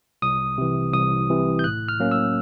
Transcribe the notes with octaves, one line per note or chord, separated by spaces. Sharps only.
C2 D#6
C3 E3
C2 D#6
C3 E3
G6
A2 F#6
F6
F#3 A#3 C#4
E6